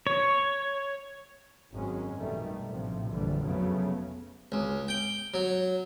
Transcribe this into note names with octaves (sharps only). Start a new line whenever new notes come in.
C#5
G#1 F#2 F#3 G#3 C#4
A#1 B2 D#3 G3 A3
A#1 A2 C3 F3
A#1 F#2 A#2 D3 E3 G3
F1 C#3 F3 F#3 A3 B3
C#2
G5
F#3